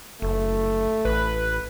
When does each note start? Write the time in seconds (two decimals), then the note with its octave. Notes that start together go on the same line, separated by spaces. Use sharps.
0.22 F#1 A3
1.05 A1 B4